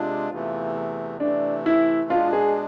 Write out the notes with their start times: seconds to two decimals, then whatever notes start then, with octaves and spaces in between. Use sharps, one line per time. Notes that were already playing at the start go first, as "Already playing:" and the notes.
Already playing: C3 G#3 D4 F4
0.31 E2 C3 E3 A3
1.20 C3 E3 A3 D4
1.66 E4
2.10 B2 G#3 D4 F4
2.33 G#4